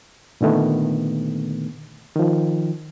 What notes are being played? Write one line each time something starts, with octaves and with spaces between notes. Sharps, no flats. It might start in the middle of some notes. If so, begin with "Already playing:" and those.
A#2 D3 D#3 A3 B3
D#3 F3